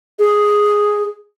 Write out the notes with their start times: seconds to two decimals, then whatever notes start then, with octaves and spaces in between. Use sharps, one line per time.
0.19 G#4